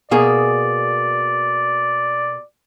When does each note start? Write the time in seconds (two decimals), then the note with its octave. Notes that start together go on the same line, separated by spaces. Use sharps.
0.11 B2 A#3 G#4 D5